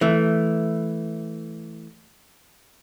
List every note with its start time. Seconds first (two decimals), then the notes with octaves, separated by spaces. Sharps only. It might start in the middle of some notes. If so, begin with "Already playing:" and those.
0.01 E3 A3